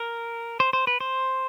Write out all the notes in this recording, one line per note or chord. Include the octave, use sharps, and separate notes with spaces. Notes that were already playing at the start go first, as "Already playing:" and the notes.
Already playing: A#4
C5
C5
B4
C5